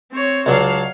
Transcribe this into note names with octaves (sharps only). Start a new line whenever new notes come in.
C4 C#5
C#2 F#3 D4 C#5 F5